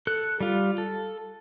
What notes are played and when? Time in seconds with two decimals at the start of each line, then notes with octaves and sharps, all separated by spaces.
0.07 A4 F#6
0.40 G3 F4
0.78 A4